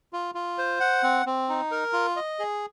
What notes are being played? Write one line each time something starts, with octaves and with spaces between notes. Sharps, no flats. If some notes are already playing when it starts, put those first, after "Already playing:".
F4
F4
C5
F#5
C4
C4
D#4
A#4
F4
D#5
G#4